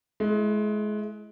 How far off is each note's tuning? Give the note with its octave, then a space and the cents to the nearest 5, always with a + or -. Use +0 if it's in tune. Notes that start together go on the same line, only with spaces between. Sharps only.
G#3 +30 E4 +15